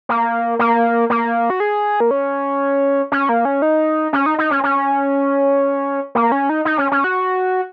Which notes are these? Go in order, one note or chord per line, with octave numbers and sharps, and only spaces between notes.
A#3
A#3
A#3
F#4
G#4
A#3
C#4
C#4
A#3
C#4
D#4
C#4
D#4
D#4
C#4
C#4
A#3
C#4
D#4
D#4
C#4
C#4
F#4